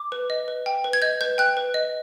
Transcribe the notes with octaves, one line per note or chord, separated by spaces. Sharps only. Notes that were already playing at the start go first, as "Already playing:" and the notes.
Already playing: D6
B4
D#5
B4
G5
B4
G#6
D#5 G6
B4 G6
G5 F#6
B4
D#5